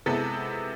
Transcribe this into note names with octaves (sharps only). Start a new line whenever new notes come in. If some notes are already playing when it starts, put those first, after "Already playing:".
C3 G#3 B3 E4 A4